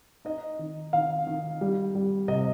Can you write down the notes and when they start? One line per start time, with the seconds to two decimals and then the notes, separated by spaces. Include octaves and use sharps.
0.25 D#4 D#5
0.59 D#3
0.93 D#3 F5
1.27 D#3
1.61 G3
1.95 G3
2.28 C3 D#5